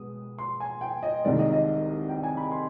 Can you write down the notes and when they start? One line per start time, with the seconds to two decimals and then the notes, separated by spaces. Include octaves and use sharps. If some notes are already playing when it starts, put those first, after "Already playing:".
Already playing: B2 G#3 B3 D#6
0.38 C6
0.60 G#5
0.81 G5
1.03 D#5
1.24 C2 C3 D#3 G#3 D5
1.39 D#5
1.53 D#5
2.09 G5
2.23 G#5
2.37 B5
2.51 C6